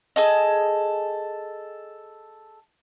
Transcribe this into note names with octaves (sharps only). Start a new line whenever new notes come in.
G#4 A4 D#5